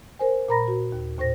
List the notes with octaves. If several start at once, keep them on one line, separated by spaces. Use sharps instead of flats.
A#4 C5 G#5
A#2 A#4 A#5 B5 A#6
F#4
D#2
D#2 A2 C5 A#6